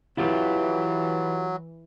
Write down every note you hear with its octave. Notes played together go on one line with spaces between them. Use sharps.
E3 F#3 E4 F4 G4